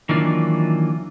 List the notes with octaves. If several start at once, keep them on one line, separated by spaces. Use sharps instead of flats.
D#3 E3 F#3 A#3 D4 F4